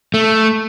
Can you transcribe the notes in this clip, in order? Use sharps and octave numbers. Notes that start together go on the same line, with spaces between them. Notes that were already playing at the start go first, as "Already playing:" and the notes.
A3